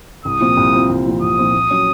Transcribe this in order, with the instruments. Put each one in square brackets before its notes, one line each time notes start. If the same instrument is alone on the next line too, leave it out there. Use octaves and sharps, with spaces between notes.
[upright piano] C2 [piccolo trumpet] D#6
[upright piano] A#2 F3 C4 F4
C2
A#2 F3 C4 F4
C2
A#2 F3 C4 F4
[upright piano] C2 [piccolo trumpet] D#6
[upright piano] A#2 F3 C4 F4
A#2
F#3 C#4